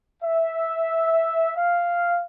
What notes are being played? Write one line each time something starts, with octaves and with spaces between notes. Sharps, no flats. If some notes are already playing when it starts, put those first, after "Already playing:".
E5
F5